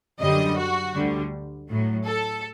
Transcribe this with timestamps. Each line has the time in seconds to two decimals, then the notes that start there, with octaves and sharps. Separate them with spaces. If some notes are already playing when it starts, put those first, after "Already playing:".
0.21 F#2 D3 G3 D#5
0.58 F#4
0.95 D2 D3 G3
1.68 A2 F#3
2.06 A4